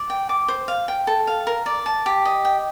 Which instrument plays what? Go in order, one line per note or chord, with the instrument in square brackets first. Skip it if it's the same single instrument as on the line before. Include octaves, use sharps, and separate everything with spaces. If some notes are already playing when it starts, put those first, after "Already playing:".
Already playing: [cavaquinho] D5
G5
D6
C5
F5
G5
A4
F5
A#4
D5
A5
G4
D#5
G5